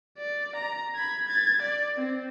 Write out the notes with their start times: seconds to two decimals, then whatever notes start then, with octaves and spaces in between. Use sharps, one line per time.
0.18 D5
0.56 A#5
0.95 B5 G#6
1.27 G#6 A6
1.62 D5
1.97 C4